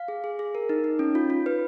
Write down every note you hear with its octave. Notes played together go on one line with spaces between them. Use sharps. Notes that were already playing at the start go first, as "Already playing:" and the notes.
Already playing: F5
G#4
G#4
G#4
A#4
D#4
D#4
C#4
F4
F4
B4